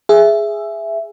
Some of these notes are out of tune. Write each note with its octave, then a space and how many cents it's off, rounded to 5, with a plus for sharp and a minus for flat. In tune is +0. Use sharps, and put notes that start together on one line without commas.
G#4 +0 E5 +10